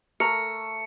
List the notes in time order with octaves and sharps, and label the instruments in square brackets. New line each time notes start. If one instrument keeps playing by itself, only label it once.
[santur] A3 [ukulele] A#4 [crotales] C#7